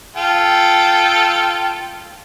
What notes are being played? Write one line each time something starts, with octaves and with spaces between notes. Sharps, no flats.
F4 A4 G5